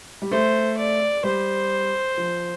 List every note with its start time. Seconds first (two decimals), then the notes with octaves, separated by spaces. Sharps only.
0.22 G3
0.31 A3 C5
0.78 D5
1.24 G3 C5
2.17 F3